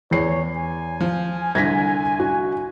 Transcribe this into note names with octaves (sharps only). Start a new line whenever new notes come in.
E2 C#5 C7
G#5
F3
C2 D3 G#6 A#6 B6
F#4